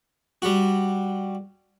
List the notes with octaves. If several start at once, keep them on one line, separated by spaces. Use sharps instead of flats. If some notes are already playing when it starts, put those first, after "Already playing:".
G3 F#4